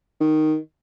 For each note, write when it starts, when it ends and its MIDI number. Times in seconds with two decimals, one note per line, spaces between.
0.21 0.57 51